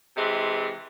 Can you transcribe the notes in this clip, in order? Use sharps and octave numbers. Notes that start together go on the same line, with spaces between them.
C3 E3 G#3